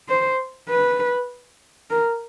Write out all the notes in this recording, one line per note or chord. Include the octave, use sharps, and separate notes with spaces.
C5
B4
A#4